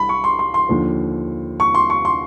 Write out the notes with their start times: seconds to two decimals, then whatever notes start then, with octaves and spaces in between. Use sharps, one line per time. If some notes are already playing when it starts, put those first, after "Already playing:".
Already playing: C2 B5
0.09 C#6
0.24 C6
0.39 C6
0.54 C6
0.69 D#2 D3 F3
1.60 C#6
1.75 C6
1.90 C#6
2.05 C6